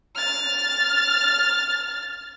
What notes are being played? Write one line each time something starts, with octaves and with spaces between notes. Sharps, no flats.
F6 A6